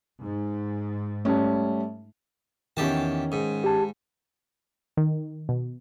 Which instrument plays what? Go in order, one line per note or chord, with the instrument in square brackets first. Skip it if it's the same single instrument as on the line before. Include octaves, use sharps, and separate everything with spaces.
[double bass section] G#2
[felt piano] G3 C#4 [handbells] A3 A5
[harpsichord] E2 G4 A5 [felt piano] D#3 C#4
[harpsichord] G#2
[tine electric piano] G4 A5
[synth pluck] D#3
B2